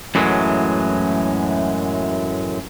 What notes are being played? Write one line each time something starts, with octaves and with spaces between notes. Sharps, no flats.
F#2 A2 E3 F#3 G#3